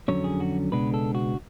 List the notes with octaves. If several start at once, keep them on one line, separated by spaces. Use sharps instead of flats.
F2 D3 F#3 C#4 C#5
G#4
F#4
C#2 B2 G#3 B3 D4 B4
A4
F#4